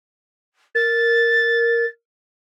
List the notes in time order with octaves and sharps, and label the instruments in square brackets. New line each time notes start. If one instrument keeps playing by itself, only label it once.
[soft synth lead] A#4 [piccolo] A6